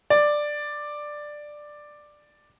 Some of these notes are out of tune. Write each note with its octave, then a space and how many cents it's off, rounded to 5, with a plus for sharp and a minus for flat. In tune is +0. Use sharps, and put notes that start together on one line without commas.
D5 +10